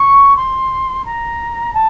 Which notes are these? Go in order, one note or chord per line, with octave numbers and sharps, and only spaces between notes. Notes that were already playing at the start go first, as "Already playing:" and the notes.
Already playing: C#6
C6
A#5
A5